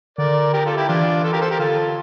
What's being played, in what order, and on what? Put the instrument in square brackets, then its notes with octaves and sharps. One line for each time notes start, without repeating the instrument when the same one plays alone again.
[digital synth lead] D3 [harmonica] A#4 D5
[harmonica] G4 A#4
F4 A4
E4 G4
[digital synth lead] E3 [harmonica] D4 F4
[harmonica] F4 A4
G4 A#4
A4 C5
G4 A#4
[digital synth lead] D3 [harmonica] F4 A4